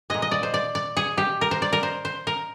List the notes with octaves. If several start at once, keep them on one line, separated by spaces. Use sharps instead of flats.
A#2 G#3 D#5
D#5
D5
C5
D5
D5
G#4
G4
A#4
C5
D5
A#4
C5
C5
A#4